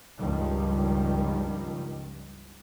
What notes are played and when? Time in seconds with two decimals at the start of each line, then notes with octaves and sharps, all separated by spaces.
0.19 C#2 G2 D#3 F3 G3